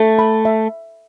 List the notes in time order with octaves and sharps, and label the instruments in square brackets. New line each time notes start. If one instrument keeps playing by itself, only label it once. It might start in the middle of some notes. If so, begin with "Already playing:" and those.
Already playing: [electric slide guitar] A3 [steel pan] A4
[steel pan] B5
E5